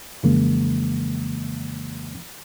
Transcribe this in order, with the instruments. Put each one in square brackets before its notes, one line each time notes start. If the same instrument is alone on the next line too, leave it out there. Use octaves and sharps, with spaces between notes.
[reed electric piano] F2 C#3 E3 G#3 A#3